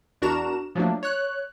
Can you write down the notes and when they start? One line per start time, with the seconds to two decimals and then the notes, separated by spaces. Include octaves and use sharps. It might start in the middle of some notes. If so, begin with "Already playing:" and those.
0.22 E2 D4 F#4 A#4 A#5 E7
0.75 F3 F#3 A3 A#3 D4
1.03 C#5 F#6